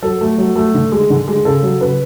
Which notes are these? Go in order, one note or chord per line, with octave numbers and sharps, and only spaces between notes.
F#3 A4
A3
F#3
A3
D3
G#3
D3
G#3
C#3 A4
F#3
C#3 B4